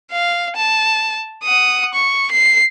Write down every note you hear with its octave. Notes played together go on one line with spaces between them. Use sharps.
F5
A5
F#5 D#6
C#6
C7